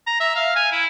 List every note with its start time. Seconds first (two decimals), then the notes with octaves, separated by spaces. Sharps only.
0.07 A#5
0.20 E5
0.35 F5
0.56 G#5
0.72 E4